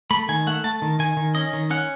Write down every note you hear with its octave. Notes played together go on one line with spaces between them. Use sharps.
A3 B5
D#3 G#5
A3 F#5
A3 A5
D#3
D#3 G#5
D#3
C#4 D#5
D#3
C#4 F#5